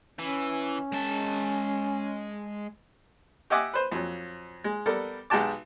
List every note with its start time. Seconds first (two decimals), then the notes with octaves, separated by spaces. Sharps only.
0.19 E3 C#4
0.92 G#3 A5
3.50 G4 D#5 E5 F#5 G#5 D6
3.73 B4 C5
3.92 F2 F#3
4.64 G#3
4.86 G3 B3 A4 A#4
5.30 B1 G#3 F#4 G4 A5 D6